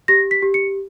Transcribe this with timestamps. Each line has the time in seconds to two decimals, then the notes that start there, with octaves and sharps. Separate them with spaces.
0.08 G4 A#6
0.31 B6
0.42 G4
0.54 C#7